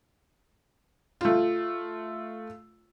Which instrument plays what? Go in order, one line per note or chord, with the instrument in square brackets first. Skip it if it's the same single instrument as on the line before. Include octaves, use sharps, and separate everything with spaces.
[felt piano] A3 F4